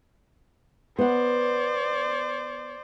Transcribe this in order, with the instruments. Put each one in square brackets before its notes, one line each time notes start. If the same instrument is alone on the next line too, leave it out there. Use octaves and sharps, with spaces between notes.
[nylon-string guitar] B3 F#5 [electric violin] C5 D5